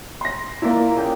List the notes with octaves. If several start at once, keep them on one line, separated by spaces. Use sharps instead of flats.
C6 A#6
A#2 A#3 E4 A#4 D5
C#3 G5